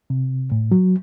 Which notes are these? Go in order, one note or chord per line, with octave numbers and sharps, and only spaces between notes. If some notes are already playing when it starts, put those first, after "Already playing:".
C3
A2
F#3